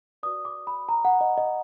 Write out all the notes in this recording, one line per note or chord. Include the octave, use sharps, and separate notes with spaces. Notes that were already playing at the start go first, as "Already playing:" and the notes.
F#4 B4 D5 D#6
D6
B5
A#5
F#5
D#5
D#5